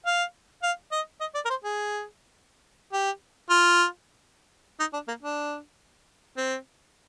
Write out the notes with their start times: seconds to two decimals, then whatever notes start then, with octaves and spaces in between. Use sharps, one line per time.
0.06 F5
0.63 F5
0.92 D#5
1.20 D#5
1.34 D5
1.45 A#4
1.50 C5
1.64 G#4
2.93 G4
3.50 F4
4.80 D#4
4.93 D4
5.08 A#3
5.23 D4
6.37 C4